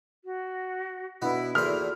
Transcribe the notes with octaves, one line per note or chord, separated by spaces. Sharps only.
F#4
B2 B3 D4 E4 F#4 B4
E2 A#2 F#4 A4 C5 C6 F6